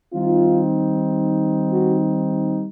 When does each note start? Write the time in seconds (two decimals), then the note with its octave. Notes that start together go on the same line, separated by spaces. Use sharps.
0.13 D#3 G3 C4 D#4 F4
1.71 F#4